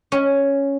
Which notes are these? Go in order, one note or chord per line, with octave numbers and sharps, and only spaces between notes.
C#4